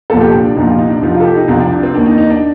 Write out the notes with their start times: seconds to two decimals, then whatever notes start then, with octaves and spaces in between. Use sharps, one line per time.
0.10 C2 A#2 F3 A4
0.21 G4
0.33 D4
0.44 D4
0.56 C2 A#2 F3 D#4
0.68 F4
0.79 D#4
0.90 D4
1.02 C2 C3 F3 D#4
1.14 F4
1.20 A4
1.25 G4
1.36 D#4
1.48 C2 C3 F3 D4
1.60 D4
1.72 D4
1.83 C4
1.94 D#2 D#3 D4
2.06 D#4
2.18 D#4
2.30 D4